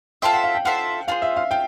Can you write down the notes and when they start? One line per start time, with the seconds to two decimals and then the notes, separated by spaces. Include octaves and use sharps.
0.22 F4 A4 C5 E5 G5
0.33 F#5
0.44 F5
0.55 G5
0.65 F4 A4 C5 E5 F#5
1.08 F4 G#4 C5 F5
1.22 E5
1.37 F5
1.51 F4 G5